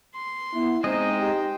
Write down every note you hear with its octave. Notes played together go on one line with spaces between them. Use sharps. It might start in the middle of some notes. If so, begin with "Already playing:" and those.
C6
B3 E4
G#3 C4 D#4 C5 D#5 G5
G4